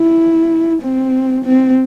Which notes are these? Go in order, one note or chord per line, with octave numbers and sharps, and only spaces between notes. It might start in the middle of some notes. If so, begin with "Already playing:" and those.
Already playing: E4
C4
C4